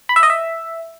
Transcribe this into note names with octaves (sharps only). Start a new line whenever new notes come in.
B5
E5
D#5
E5